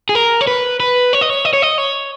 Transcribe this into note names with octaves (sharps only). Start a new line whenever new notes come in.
G#4
A#4
C#5
B4
B4
C#5
D#5
C#5
D#5
C#5
D#5
C#5